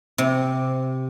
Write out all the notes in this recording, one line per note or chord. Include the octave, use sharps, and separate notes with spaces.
C3